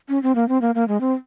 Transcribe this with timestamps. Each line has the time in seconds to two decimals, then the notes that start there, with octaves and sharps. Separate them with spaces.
0.09 C#4
0.23 C4
0.35 A#3
0.49 C4
0.62 A#3
0.75 A#3
0.88 G#3
1.01 C4